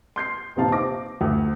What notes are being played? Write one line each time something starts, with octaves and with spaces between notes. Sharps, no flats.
C6 G6 C7
D#1 A#1 C3 D#4 F5 A5
C5 D6 A#6
D2